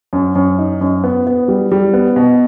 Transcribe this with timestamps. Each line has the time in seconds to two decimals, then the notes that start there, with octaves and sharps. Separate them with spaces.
0.13 F#2
0.36 F#2
0.59 D#4
0.81 F#2
1.04 B3
1.27 B3
1.48 G3
1.72 G3
1.94 B3
2.16 B2